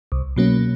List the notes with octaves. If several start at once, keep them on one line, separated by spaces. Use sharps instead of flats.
C2
B2 F#3 A#3 C#4